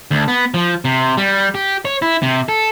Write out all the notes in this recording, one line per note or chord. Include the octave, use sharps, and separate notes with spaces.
D2
B3
F3
C3
G3
G4
C#5
E4
C3
A4